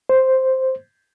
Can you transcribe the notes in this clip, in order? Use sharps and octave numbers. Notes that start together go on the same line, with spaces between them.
C5